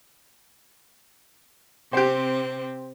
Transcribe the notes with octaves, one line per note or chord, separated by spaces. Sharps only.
C3 C4 G4 C5